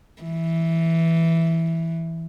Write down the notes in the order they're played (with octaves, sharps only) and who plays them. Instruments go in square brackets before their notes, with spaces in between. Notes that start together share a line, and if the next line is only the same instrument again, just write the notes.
[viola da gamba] E3